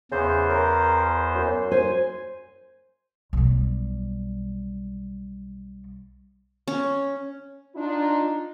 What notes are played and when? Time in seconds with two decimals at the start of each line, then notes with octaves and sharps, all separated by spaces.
0.12 E2 C#3 C5
0.49 A#4
1.35 F#2
1.72 C5 G#5
3.33 B1 G3
6.68 C#4
7.75 D4 D#4 F4